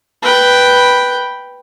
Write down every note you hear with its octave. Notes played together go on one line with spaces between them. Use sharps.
B4 G5